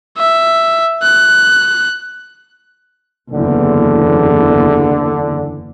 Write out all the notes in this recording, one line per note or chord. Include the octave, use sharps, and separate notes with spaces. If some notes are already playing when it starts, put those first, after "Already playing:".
E5
F#6
F#1 E2 D3